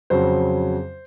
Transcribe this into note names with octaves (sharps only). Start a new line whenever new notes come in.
F2 C#3 F#3 C5